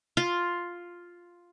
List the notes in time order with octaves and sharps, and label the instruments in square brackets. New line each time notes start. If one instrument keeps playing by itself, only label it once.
[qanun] F4